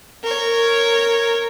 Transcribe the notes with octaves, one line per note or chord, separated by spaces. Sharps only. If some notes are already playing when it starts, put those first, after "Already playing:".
A#4 C#5